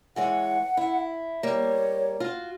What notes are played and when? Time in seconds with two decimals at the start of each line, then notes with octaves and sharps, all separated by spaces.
0.16 E3 G#3 C#5 F#5
0.77 E4
1.43 G3 A#3 C#5
2.20 F4 F#4